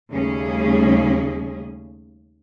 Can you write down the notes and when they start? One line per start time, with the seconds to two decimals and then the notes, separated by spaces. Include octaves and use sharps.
0.11 D#2 C#3 G3 A3 C#4 G#4